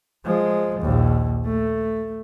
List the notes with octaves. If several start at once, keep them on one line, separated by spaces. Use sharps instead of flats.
F3 G#3
A#1 D#2
A3